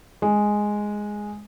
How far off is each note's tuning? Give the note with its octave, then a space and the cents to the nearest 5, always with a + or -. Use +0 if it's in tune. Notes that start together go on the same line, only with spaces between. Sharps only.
G#3 +0